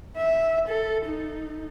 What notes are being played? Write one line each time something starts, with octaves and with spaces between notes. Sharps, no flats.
E5
A4
D#4